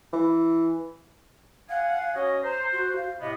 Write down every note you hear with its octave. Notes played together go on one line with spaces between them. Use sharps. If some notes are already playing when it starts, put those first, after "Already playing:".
E3
F5 F#5 G#5
C#4 F#4 C#5 D#5
C5 A#5
F#4
F5
A2 C3 B3 D#5